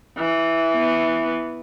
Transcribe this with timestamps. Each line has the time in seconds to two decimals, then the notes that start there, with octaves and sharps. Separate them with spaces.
0.17 E3
0.74 B3